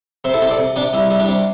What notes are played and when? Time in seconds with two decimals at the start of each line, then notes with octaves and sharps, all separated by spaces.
0.24 C3 C5 E5
0.34 E4 A4
0.41 C3 G4 C5
0.51 A4 D5
0.59 C3
0.76 C3 D4 G4
0.93 G3 E4
1.11 G3 E4
1.20 D4 G4
1.28 C3